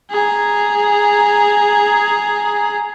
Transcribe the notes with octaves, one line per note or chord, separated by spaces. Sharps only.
G#4 A#5